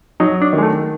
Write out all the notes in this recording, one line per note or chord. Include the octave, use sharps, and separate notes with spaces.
F#3 D#4
D4
D#3
G#3
A3